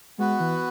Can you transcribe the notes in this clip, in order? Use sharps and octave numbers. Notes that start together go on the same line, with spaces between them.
G#3 B3 F#4 B4
E3